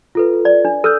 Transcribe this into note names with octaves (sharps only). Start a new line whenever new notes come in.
F4 A4 B4
D5
D4
A4 E6 F6 G6